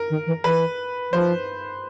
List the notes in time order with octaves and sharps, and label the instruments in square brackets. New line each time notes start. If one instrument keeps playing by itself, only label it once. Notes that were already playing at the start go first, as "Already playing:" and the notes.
Already playing: [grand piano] A#4
[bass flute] D#3
E3
[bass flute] E3 [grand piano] B4
[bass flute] F3 [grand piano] C5